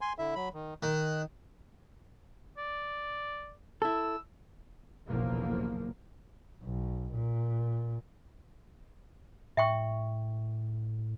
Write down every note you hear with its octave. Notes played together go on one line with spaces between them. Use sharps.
G#5 C6
D3 E4 E5
F#3 B5
D#3
D#3 F#6
D5
E4 A4 E6
F#1 B1 E2 A#2 F3 A#3
B1
A#2
A2 E5 G5 C#6